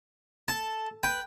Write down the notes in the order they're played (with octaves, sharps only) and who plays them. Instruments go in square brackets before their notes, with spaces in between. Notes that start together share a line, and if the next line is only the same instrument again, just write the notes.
[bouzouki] A4 [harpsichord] A5
[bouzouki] B4 [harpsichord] G5